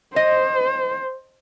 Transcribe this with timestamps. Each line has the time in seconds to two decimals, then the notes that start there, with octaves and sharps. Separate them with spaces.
0.16 C5 D#5